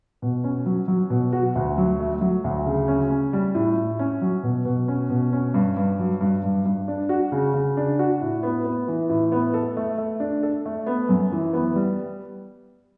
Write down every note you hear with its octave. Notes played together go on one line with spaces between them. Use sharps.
B2
C#4
F#3
F#3
B2
F#4
D2
F#3
A3
F#3
D2
C#3
C#4
C#4
G3
A2
A2
C#4
F#3
B2
B2
C#4
B2
C#4
G2
G2
F#3
G2
G2
G2
D4
F#4
C#3
C#3
D4
F#4
A2
B3
B3
E3
A2
B3
A4
A3
A3
D4
A4
A3
B3
F#2
E3
B3
G3